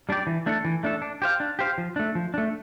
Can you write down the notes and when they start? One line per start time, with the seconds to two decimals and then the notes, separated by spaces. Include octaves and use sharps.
0.09 G3 D4 G4 D5
0.27 E3
0.46 A3 D4 A4
0.65 E3
0.83 A3 D4 A4
1.02 D4
1.22 G4 C5 F5
1.40 D4
1.59 G4 C5 F5
1.78 F3
1.96 A3 D4
2.15 F3
2.34 A3 D4